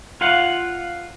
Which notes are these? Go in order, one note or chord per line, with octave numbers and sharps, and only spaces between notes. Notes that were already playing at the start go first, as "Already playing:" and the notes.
F4 F5 F#5